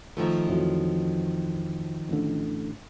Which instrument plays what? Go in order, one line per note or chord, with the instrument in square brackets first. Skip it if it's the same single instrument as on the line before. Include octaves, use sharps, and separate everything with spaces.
[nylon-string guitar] D#3 F3 A3
[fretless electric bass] F2 E3 F#3
A1 D3